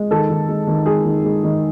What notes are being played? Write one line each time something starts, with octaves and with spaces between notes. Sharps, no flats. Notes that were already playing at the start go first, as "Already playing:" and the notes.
Already playing: G#3
D#3 A4
D#3
G#3
D#3
G#3 G#4
D#3
G#3
D#3